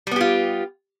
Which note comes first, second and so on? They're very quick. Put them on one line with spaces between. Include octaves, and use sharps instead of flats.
G3 B3 G4 F4